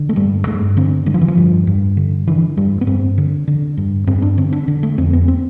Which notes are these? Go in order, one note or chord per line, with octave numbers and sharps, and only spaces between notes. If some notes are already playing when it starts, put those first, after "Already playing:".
Already playing: D3
A3
G2 G3
G2 A3
D3 C4
D3 G3
F3
E3
F3
G2
G2
D3
D3 E3
G2 G3
B3
G2 C4
D3
D3
G2
G2 C4
D4
D3 C4
D4
D3
A3
F2 C4
B3
C4